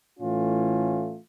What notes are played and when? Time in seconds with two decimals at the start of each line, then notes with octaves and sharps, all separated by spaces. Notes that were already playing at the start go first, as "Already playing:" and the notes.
0.19 A2 E3 A3 C#4 F4